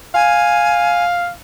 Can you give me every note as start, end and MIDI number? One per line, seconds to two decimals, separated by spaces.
0.14 1.29 77
0.14 1.04 80